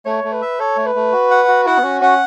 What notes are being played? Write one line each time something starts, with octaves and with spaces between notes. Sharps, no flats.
A3 C#5
A3
B4
E5
A4 C#5
A3
B4
A3
F#4
F#5
F#4
E4 F#5
B3
C#4 F#4
C#4 F#5